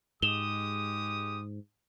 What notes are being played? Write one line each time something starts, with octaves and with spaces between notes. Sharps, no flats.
G#2 G#3 G4 D#6 E7 F7 G7